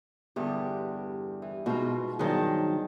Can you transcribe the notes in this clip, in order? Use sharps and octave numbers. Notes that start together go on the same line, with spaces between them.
E2 G2 D3 G4
E3
G#2 B2 F4 F#4
G2 D#3 F#3 G#4 C5 A5